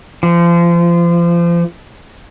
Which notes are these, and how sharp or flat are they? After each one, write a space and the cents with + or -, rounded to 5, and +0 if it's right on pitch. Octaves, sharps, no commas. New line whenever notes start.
F3 -30